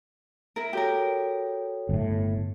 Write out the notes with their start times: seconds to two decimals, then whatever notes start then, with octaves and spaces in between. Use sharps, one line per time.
0.56 E4 A#4
0.73 F#4 G4 A4 A#4 C#5
1.89 G1 A2